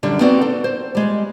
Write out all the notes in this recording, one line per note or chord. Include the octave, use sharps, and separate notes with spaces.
F#2 D3 G3
B3 C4 D#4 F#4 D5
A4
C5
G3 G#3